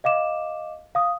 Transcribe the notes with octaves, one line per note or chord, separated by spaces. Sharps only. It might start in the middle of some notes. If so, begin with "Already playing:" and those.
D#5 F5 D6 E7
F5 D#6